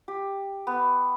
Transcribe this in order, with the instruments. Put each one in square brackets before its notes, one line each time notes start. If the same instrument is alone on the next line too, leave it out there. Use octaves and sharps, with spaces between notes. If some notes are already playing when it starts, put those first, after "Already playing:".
[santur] G4
B3